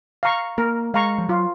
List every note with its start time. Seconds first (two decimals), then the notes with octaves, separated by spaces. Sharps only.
0.23 F5 A#5 C#6
0.58 A#3 A#4
0.94 G#3 F5 A#5 C#6
1.18 F3
1.29 F#3 F4